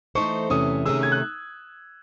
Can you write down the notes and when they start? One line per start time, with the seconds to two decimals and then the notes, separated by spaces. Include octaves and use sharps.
0.15 E3 A3 D#4 A4 C5 C#6
0.50 E2 C3 E3 A3 C#4 D#6
0.86 C3 D#3 A3 C#4 G#4 E6
1.03 G#6
1.12 F#6